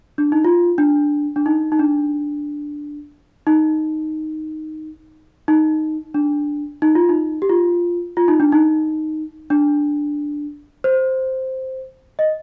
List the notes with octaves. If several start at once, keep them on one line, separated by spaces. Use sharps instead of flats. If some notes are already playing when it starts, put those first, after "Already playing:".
D4
D#4
F4
D4
D4
D#4
D#4
D4
D#4
D#4
D4
D#4
F4
D#4
G4
F4
F4
D#4
D4
D#4
D4
C5
D#5